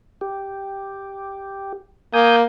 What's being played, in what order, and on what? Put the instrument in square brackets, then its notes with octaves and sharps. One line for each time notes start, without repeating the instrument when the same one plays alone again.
[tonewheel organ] G4
[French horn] A#3 [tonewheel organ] G#5 D#6 G6